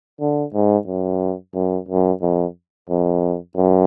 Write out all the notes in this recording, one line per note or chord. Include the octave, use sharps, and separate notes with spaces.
D3
G#2
F#2
F#2
F#2
F2
F2
F#2